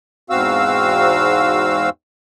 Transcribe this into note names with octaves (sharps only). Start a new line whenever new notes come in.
E2 G#2 C4 F#4 F5 E6